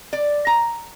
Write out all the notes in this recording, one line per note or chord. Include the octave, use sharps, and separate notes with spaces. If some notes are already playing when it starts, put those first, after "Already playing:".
D5
A#5